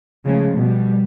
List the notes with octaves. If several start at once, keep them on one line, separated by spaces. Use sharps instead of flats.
C#3 F3 G#3 A3
B2 G3